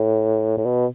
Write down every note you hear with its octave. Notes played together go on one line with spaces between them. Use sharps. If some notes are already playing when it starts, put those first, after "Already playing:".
Already playing: A2
A2
B2